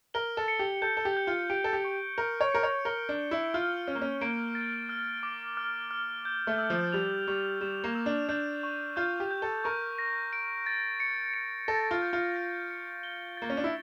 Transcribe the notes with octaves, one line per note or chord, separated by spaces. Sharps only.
A#4 G7
A4
C#7
G4
A4 G6
A4
G4
G6
F4
G4 D7
A4
G4
C#6
A#4 G6
C#5
A#4 C#7
C#5
A#4 G7
D4
G7
E4
F4 F6
C#4 F6
A#3
C#4
A#3 D7
A6
F6
D6
F6
F6
G6
A3
E6
F3
G3 F7
G3 C#6
G3 E7
A#3
E6
D4
D4 G6
C#6
F4 G6
G4
G6
A4
A#4 C#6
A#6
D7
A6
C#7
C#7
A4 A#6
F4
G6
F4
A#6
C#7
G7
A#3 A6
C#4
D4
E4